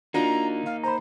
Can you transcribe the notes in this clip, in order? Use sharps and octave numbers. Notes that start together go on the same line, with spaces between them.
A#3 D4 D#4 F4 F#4 A#5
F5
C5 A#5 B5